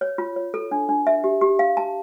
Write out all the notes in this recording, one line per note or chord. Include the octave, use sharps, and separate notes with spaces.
C#5
F4
C#5
A4
D4
D4
E5
G4
G4
F5
A5